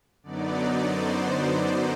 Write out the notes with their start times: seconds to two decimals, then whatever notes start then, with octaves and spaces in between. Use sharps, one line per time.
0.23 F#2 D3 F#3 B3 D#4 D5
0.85 C5